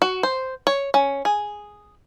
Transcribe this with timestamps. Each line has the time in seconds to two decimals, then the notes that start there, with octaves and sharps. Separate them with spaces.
0.02 F#4
0.23 C5
0.67 C#5
0.94 C#4
1.25 G#4